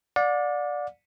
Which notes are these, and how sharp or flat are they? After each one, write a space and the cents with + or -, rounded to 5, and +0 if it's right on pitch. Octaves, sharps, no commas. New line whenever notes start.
D5 +0 F#5 -45